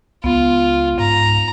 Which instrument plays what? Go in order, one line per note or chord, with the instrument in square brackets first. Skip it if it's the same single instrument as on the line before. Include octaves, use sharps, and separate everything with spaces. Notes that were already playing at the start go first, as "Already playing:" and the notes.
[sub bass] C#2 [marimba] B3 [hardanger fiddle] F4
[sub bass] G#2 [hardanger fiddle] A#5